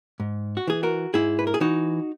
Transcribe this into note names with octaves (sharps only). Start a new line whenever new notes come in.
G#2
F#4
E3 G#4
F#4 A#4
G#2 E4 G#4
B4
A#4
G#4
E3 D#4 F#4